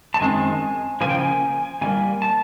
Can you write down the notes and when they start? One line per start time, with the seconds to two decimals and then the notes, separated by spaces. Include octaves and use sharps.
0.14 A5
0.20 F#2 D#3 G#3 C4 G#5
1.01 C#3 F3 A#3 G#5
1.09 G5
1.19 G#5
1.81 C3 E3 G3 A#3 G#5
2.22 A5